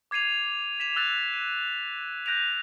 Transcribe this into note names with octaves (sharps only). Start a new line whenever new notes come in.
D6 G#6 C7 D#7 F7
B6 E7 F7
E6 F#6 A6 F7
D#7
F#6 G6 A#6 D7 D#7 F7